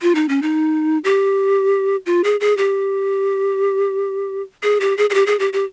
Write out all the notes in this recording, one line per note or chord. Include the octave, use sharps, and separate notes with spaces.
F4
D#4
C#4
D#4
G4
F4
G#4
G#4
G4
G#4
G4
G#4
G#4
G4
G#4
G4
G4